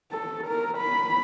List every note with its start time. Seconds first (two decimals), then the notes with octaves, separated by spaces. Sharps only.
0.12 A4
0.47 A#4
0.78 B5